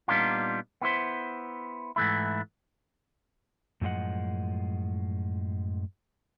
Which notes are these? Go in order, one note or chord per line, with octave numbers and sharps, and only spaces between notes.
A#2 G3 B3 D4 D#4 F4
B3 E4 C5
G#2 E3 A3 E4
F#2 A2 F3 G#3 D#5 F#5